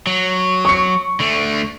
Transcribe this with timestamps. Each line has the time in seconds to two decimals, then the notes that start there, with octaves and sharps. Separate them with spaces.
0.07 F#3
0.65 C#6 C#7
1.20 D3 A3